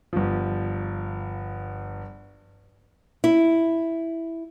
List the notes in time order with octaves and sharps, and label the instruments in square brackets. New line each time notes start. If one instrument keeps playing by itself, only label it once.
[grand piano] G1 F3
[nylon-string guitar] E4